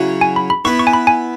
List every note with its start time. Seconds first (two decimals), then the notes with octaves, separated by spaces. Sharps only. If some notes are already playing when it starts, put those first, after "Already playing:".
Already playing: C#3 F#3 E4 C#5
0.21 G#5
0.36 B5
0.50 B5
0.65 B3 E4 B4 E5 C#6
0.79 C#6
0.87 G#5
0.93 B5
1.07 G#5